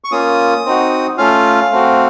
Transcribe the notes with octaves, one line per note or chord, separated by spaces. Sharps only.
C#6
A#3 C#4 F4 D#6
C4 D#4 F#4
A3 C#4 F4 F5
A3 C4 F#4